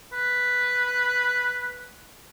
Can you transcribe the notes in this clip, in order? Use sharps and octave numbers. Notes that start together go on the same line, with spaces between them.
B4